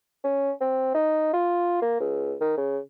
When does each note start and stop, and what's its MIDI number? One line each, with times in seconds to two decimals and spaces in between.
0.24 0.51 61
0.61 0.90 60
0.95 1.30 63
1.33 1.79 65
1.82 1.96 58
2.00 2.35 37
2.41 2.55 51
2.58 2.78 49